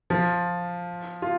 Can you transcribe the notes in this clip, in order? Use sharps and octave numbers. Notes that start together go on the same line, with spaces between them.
F3 F4
F4